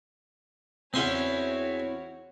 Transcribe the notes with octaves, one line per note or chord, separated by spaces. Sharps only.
E2 C4 C#4 E4 F#4 C#5 C6